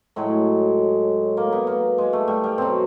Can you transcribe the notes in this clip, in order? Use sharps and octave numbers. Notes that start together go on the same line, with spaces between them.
A2 F#3 G#3
A#3
B3
A#3
G#3
A3
G3
G3
B2 F#3 C4